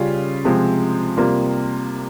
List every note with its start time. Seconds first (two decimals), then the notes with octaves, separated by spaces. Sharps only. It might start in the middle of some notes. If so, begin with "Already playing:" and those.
Already playing: C#3 G3 C#4 F4
0.45 C3 F3 G#3 C4
1.17 C3 G3 A#3 F4